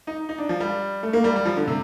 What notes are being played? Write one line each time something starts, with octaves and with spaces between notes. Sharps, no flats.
D#4
D#4
D4
F3
G3
A3
A#3
G3
G3
F3
D3
C3